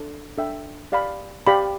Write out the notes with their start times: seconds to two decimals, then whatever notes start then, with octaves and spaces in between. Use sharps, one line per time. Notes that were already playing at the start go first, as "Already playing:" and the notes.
Already playing: D4 A4
0.37 D4 A4 E5 G5
0.92 G4 D5 F5 B5
1.47 G4 D5 F5 B5